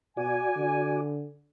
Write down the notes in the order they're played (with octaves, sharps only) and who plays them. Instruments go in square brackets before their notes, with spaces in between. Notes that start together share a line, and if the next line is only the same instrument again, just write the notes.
[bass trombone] B2 [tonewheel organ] F#4 D5 [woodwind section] G#5
[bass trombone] D3